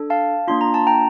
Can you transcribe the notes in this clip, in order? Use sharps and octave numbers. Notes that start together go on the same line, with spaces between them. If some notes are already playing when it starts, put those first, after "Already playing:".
Already playing: D4 A4
F5 A5
A#3 D4 F4 C6
A#5
A5
G5 A#5